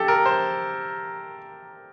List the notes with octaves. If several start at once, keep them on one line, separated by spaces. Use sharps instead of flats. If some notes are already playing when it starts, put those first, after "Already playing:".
Already playing: G4 A4
A#4
C5